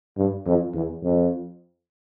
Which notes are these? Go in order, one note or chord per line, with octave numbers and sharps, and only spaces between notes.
G2
F2
E2
F2